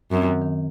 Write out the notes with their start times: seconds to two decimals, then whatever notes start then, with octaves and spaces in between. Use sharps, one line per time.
0.11 F#2 C4
0.26 D#3
0.41 D#3